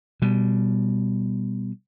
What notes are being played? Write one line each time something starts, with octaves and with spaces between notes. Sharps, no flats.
B2 G3